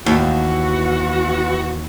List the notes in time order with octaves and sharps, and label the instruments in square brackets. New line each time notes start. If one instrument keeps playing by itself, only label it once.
[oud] D#2 [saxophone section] E3 B3 F#4